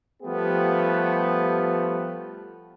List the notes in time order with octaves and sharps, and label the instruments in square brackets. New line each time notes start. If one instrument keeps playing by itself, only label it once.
[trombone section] F3 G3 A3 B3 G4